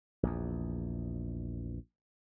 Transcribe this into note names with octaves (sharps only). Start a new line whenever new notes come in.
A#1 E2